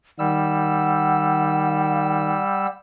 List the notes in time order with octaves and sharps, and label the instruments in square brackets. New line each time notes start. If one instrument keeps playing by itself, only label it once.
[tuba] D#3 [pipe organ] G3 E6 [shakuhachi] F#5